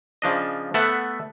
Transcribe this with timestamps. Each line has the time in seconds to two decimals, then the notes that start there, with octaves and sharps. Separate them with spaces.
0.22 C#3 F3 D4 D#5
0.74 A3 B3 E5 F#5